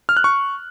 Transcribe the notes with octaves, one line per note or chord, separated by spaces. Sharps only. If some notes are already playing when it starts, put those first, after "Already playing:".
F6
F#6
C#6